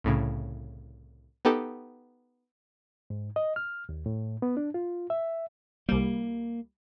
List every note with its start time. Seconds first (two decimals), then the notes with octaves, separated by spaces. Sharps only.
0.04 C2 A2 C#3
1.45 B3 D#4 G4 A4
3.10 G#2
3.36 D#5
3.56 F6
3.89 D#2
4.06 A2
4.42 B3
4.57 D4
4.74 F4
5.10 E5
5.89 C2 G3 A#3